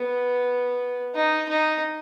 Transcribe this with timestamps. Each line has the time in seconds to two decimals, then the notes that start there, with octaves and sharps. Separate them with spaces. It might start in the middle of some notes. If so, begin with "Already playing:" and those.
Already playing: B3
1.15 D#4
1.49 D#4